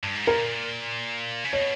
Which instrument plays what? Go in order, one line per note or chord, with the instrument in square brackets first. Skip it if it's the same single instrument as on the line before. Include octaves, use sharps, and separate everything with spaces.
[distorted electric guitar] G2
G#2
[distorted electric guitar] A#2 [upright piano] A#4
[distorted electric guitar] C#3
[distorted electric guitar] B2 [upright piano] C#5